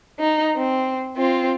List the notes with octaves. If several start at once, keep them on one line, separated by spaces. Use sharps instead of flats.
D#4
C4
C4 F4